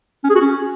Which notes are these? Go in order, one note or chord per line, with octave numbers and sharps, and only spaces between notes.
C#4
G#4
F#4
C#4